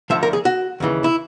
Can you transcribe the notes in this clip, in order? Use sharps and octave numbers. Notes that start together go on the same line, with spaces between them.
D2 D3 F3 E5
A#4
G#4
F#4
D#2 C#3 E3
E4